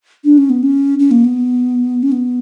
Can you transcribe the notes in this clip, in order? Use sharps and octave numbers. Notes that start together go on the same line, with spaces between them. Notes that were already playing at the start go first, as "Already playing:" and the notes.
D4
C#4
B3
C#4
C#4
A#3
B3
C#4
B3